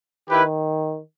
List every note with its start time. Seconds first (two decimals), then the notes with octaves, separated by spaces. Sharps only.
0.30 D#3 E4 G4 B4